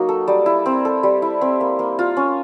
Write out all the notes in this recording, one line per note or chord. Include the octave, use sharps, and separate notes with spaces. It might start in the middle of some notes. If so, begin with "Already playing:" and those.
Already playing: F#3 A#3 D#4
A4
G3
E4
C4
A4
G3
E4
C4
A#3
A#3
F4
C#4